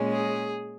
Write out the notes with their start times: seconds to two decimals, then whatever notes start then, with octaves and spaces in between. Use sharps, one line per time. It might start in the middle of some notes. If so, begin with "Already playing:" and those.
Already playing: A#2 G#3 C#4
0.11 G#4